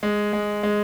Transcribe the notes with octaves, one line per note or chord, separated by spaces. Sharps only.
G#3
G#3
G#3